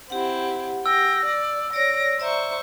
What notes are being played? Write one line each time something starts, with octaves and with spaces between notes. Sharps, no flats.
C4 E4 G4 F#5
G5 E6 A#6
D5
C#5 D5 A#6 D7
C5 D5 E5 A#5 C#6